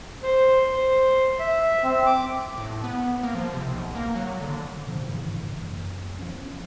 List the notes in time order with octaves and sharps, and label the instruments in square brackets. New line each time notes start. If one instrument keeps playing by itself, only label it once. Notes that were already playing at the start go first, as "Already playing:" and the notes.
[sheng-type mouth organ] C5
C5
E5
C4
D6
[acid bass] A2
B3
A#3
F3
C3
B1
A#3
F#3
D3
[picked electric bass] A#2 D3 F3
G#1 G2 C#3 E3
F#1
F3 B3 C#4